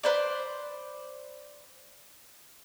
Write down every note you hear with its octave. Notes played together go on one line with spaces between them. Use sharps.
B4 C5 D5